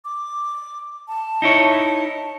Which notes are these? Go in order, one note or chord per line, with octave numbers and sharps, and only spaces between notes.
D6
A5
D#4 E4 C#5